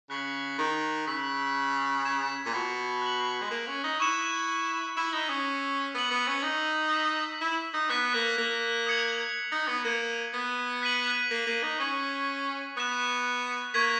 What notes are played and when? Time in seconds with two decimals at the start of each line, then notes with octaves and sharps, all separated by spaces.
0.10 C#3 F#6 B6 F#7
0.58 D#3
1.07 C#3 E6 B6 F#7
2.05 G#6 B6 E7
2.45 A#2
2.54 B2
3.02 F#6 B6 F#7
3.42 G#3
3.51 A#3
3.67 C#4
3.84 D#4
4.00 E4 C#6 F#6 C#7 E7
4.97 E4 C#6 E6 B6 E7
5.13 D#4
5.30 C#4
5.95 B3 E6 B6 D#7 F#7
6.11 B3
6.27 C#4
6.43 D#4
6.92 E6 B6 E7
7.41 E4
7.74 D#4
7.90 B3 F#6 B6 E7
8.14 A#3
8.38 A#3
8.87 D#6 G#6 C#7 F#7
9.52 D#4
9.68 B3
9.84 A#3 G#6 D#7 F#7
10.33 B3
10.82 F#6 B6 D#7 F#7
11.31 A#3
11.47 A#3
11.63 D#4
11.79 C#4 C#6 G#6 B6 F#7
12.77 B3 D#6 F#6 A#6 E7
13.74 A#3 C#6 G#6 B6